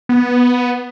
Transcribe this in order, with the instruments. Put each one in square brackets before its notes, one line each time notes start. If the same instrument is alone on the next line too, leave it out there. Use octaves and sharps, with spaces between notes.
[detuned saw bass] B3